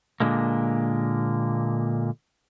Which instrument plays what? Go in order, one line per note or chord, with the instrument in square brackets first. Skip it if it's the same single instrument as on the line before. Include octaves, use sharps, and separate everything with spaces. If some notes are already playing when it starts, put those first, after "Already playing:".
[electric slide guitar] A#2 D3 G#3 A#3